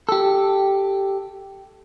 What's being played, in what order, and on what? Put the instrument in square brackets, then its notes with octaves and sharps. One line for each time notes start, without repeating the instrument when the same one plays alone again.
[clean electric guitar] G4 A4